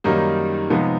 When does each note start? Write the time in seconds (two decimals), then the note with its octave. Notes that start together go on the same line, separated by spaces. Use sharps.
0.04 F#2 D#3 G3 A#3 D#4
0.70 C3 F3 G#3 B3 D#4